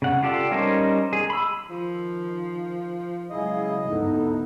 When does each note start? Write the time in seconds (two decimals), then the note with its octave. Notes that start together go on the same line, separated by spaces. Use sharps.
0.02 C#3 F#5
0.23 F4 G4 A4 D5
0.51 G3 C#4 D#4 A#4 C5
1.13 G#4
1.30 B5 C6 E6
1.69 D#3 F3
3.30 C#3 F#3 G#3 E4 G#4 D#5 F5
3.88 F#1 D2 G#2 B3 D#4 E4 A4